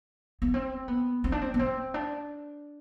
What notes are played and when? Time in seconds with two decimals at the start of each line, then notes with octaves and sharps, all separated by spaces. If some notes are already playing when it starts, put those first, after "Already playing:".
0.42 B3
0.54 C4
0.88 B3
1.24 C4
1.32 D4
1.42 C4
1.54 B3
1.59 C4
1.94 D4